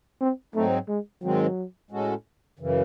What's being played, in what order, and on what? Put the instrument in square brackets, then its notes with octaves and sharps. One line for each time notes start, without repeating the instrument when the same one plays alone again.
[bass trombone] C4
[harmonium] G#2 F#3 C4 D#4 [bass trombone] A3
[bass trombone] G#3
[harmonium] G#2 D#3 G#3 C4 [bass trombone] F#3
[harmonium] A2 G#3 C#4 F#4 A4
F#2 C#3 E3